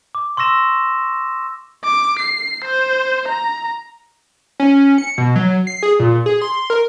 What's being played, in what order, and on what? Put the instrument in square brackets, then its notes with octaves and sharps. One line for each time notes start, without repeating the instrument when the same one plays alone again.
[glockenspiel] D6
C6 C#6 E6 A#6 E7
[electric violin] D6
C7
C5
A#5
[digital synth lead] C#4
C#7
B2
F#3
C7
G#4
A#2
G#4
C6
A#4